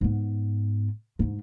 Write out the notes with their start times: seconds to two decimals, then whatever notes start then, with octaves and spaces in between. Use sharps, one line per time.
0.01 G#2 B3
1.19 D2 G#2